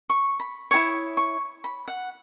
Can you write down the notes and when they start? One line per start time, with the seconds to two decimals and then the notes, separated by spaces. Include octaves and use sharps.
0.10 C#6
0.40 B5
0.71 E4 G#4 C#5 D#6
1.17 C#6
1.64 B5
1.88 F#5